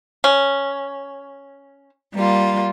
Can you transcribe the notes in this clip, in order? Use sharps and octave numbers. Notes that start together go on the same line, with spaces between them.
C#4
G3 A#3 F4